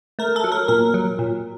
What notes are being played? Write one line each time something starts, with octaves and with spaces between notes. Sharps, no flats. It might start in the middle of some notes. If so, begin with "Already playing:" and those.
A3 A#4
A4
F#3
A#4
A#2 A#4
F#3
A#2